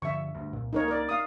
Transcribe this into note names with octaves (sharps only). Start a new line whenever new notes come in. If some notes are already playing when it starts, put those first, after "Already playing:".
G2 D3 F3 E5 C#6
D2 G2
C2 A#2
C#2 A3 A#3 D#4 A#4 C#5
A#4 D5
F5 D#6